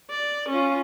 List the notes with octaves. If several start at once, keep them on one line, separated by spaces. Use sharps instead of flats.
D5
C#4 F4